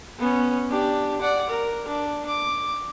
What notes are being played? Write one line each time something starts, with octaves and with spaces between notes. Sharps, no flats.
B3 C#4
D4 G4
D5 F#5
A#4
D4
D6